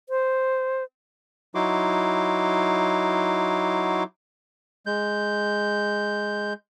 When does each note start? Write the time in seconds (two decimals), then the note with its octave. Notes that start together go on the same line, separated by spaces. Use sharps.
0.09 C5
1.55 F#3 D#4 E4 F#4 C6 D6
4.86 G#3 G6